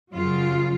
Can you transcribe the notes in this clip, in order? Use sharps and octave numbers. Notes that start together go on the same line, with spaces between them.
F#2 C#3 F#3 F4